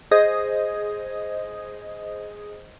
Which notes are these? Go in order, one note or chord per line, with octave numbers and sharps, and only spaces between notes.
G#4 C5 D#5 D#6 G#6